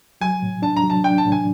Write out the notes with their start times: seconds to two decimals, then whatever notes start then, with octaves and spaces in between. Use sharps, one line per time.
0.21 F#3 G#5
0.42 A2
0.62 D4 A5
0.77 A#5
0.84 F#3
0.90 A5
1.04 D4 G5
1.18 A5
1.25 A2
1.32 G#5